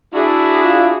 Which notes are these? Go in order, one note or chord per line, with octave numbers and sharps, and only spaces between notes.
D4 E4 F#4 G#4
F4